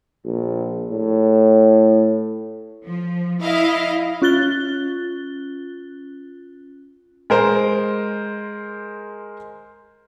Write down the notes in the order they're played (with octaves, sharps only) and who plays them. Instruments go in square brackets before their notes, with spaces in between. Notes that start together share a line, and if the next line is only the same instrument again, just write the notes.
[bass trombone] A#1
A2
[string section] F3
E4 D#5 F5
[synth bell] C#4 F4 F#6 A6 G7
[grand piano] G#3 A#4 C5